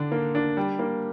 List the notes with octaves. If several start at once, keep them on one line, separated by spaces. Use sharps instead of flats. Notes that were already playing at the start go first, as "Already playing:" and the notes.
Already playing: D3 D4
A#3
D4
G3
A#3